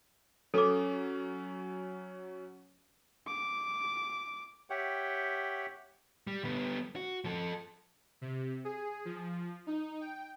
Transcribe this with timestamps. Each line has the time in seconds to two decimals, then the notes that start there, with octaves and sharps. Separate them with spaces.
0.54 F#3 C#4 A4 D6
3.27 D6
4.70 G4 C#5 E5 F#5 G5
6.27 G3
6.45 G3 B3
6.96 F#4
7.25 F3 A4
8.21 C3
8.65 G#4
9.05 F3
9.67 D#4
10.01 G5